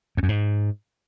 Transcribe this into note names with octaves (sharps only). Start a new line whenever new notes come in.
F2
F#2
G#2